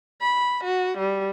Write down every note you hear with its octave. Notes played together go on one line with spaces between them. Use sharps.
B5
F#4
G3